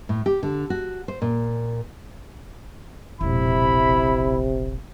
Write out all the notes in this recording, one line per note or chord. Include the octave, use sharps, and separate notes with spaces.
A2
G4
D3
F#4
C5
A#2
E1 A#1 C3 E4 B5